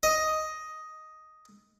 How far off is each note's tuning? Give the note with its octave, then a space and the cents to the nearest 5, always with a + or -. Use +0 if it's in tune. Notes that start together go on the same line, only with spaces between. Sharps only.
D#5 +5